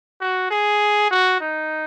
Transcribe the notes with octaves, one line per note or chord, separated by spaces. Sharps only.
F#4
G#4
F#4
D#4